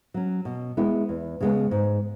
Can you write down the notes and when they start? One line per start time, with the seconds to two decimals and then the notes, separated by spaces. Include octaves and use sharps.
0.14 F#3 C#4
0.45 B2
0.77 G#3 B3 E4
1.09 E2
1.41 C#3 G#3 B3
1.71 G#2